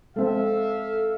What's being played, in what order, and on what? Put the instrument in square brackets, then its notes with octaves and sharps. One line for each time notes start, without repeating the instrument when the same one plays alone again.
[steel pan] G#3 C4 [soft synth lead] A4 [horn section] E5 F5